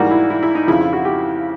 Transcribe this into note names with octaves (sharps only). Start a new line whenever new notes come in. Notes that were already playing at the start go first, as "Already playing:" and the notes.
Already playing: G#2 E3 G3 A#3 F#4
E4
E4
E4
D#4
F2 C#3 F3 E4
F4
F#4
G4